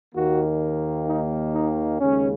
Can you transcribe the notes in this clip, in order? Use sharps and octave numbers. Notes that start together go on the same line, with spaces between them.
D#2 D#3 A#3 F#4
D#4
D#4
D#2 C#3 G#3 C#4